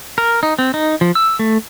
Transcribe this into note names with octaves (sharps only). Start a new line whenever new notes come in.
A#4
D#4
C4
D#4
F3
E6
A3